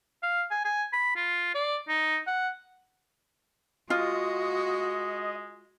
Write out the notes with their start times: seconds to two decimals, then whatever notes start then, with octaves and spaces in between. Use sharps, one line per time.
0.23 F5
0.51 G#5
0.65 G#5
0.93 B5
1.16 F4
1.55 D5
1.89 D#4
2.27 F#5
3.90 G#3 F4 F#4 D#5